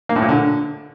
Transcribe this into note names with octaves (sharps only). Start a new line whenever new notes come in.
A#3
A2
A#2
D3